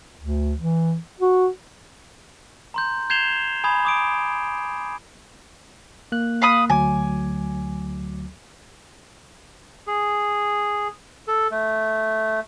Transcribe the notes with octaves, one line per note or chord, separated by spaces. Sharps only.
D2
E3
F#4
A#5 C6 G6
G6 G#6 C7 E7 F7 G7
G#5 B5 D#6 G#6
D6 D#6 D7
A#3 F#6
F5 B5 D#6
D2 F#3 G#5 D6
G#4
A4
A3